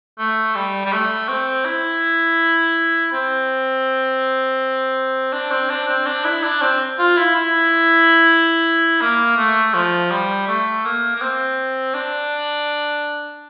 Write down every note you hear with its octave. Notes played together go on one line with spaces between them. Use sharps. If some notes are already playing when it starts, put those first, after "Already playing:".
A3
G3
G3
A3
C4
E4
C4
D4
C4
D4
C4
D4
E4
D4
C4
F4
E4
E4
A#3
A3
F3
G3
A3
A#3
A#3
C4
D4